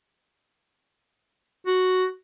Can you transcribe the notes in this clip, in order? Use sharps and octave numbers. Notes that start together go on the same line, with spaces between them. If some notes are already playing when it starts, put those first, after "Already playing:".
F#4